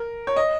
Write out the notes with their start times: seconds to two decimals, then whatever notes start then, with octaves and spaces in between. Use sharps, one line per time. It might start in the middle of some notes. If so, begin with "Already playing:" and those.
Already playing: A#4
0.27 C#5
0.36 D#5